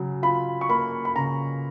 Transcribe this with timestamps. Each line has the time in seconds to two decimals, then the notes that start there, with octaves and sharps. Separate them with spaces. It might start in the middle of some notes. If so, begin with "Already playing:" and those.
Already playing: C#3 F#3
0.23 F4 B5
0.61 C#6
0.69 A#3 B5
1.05 B5
1.16 C#3 A#5